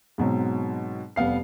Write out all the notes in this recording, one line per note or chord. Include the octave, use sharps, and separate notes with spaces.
G#2 B2 F#3 C4
F1 G3 B3 F5 C7